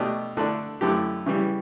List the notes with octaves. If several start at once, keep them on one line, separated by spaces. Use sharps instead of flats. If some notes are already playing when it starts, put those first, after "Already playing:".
Already playing: B2 A3 D4 G4
D3 A3 D4
F#2 D3 A3 E4 G4
C#3 E3 G3